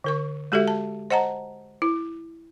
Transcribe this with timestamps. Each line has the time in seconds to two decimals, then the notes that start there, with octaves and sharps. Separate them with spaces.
0.04 D3 A#4 C#6
0.52 G#3 F#4 G4 A4 E5
0.68 A5
1.10 C5 D#5 F#5 A5 A#5
1.82 E4